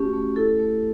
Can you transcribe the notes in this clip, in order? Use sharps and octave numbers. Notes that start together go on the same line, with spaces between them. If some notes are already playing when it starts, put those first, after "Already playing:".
Already playing: A3 C#4 F#4 G4
A3
E4 A4
A3